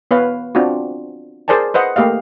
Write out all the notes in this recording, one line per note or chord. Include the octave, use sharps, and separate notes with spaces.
B3 B4 C#5 F5
C4 D4 F4 F#4
G#4 A#4 C5 D5 G#5 A5
B4 C5 D#5 F#5
A3 A#3 G4 D#5 F5